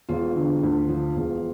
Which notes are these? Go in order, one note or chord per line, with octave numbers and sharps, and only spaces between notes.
E1 F4
D3
D2
F3
E1